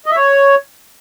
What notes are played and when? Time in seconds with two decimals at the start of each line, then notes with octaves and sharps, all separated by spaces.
0.06 D#5
0.11 E5
0.16 C#5